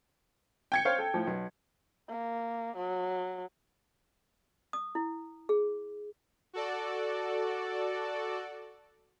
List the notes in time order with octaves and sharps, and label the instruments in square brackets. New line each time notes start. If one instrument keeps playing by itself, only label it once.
[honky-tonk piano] G5 G#6 C#7
[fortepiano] C5 C#5 F5
A4
A2 F3
B1
[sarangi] A#3
F#3
[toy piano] D#6
E4
G#4
[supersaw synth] F#4 A4 D5